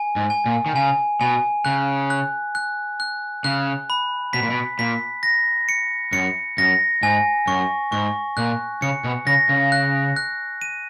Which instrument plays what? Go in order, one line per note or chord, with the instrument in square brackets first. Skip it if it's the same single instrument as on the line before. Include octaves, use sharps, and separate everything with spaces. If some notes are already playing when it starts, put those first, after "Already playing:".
Already playing: [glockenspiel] G#5
[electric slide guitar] G#2
[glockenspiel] G#5
[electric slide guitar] A#2
D#3
[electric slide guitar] C#3 [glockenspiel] G#5
[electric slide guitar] B2 [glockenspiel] G#5
[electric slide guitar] C#3 [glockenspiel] F#6
[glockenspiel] F#6
F#6
F#6
[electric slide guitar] C#3 [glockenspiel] F#6
[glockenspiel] B5
[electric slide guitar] B2 [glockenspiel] B6
[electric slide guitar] A#2
B2
[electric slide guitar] A#2 [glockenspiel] B6
[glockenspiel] A#6
C#7
[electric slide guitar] F#2 [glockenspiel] C#7
[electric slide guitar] F#2 [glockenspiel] A#6
[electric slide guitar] G#2 [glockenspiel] G#5
[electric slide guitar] F#2 [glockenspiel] C#6
[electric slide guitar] G#2 [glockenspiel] C#6
[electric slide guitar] A#2 [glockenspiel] F#6
[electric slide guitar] C#3 [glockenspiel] C#7
[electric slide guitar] B2
[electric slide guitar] C#3 [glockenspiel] A#6
[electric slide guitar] C#3
[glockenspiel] F#6
F#6
D#7